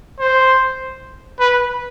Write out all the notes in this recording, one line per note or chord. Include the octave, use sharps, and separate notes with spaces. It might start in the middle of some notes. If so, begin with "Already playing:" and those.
C5
B4